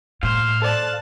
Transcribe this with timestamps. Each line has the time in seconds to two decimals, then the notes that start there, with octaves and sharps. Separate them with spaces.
0.23 A2 C5 F5
0.62 A4 C5 D5 A5 F#6